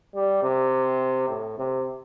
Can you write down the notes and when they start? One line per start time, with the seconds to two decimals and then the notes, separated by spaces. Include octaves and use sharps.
0.14 G3
0.43 C3
1.29 A2
1.58 C3